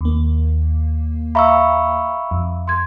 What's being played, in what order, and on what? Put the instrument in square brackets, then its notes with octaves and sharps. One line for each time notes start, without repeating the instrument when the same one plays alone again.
[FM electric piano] D#2 A#3
[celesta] E5 F5 A#5 [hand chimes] B5 C#6 E6
[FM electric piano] F2
[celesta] C6 G#6